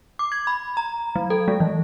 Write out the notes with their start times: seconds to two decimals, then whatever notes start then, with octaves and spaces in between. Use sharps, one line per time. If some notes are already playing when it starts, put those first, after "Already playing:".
0.19 D6
0.32 G#6
0.47 B5
0.77 A#5
1.16 F#3
1.30 A4
1.48 G#3
1.60 E3